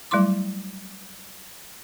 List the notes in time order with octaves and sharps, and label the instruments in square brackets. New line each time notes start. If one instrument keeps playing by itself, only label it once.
[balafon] F#3 G3 A3 E4 C6 D6